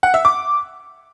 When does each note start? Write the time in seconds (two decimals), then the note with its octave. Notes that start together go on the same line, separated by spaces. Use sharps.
0.03 F#5
0.14 E5
0.25 D6